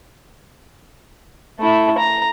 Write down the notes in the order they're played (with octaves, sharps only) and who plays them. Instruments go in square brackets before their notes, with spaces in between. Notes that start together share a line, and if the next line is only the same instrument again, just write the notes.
[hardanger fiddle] A3 E4
A#5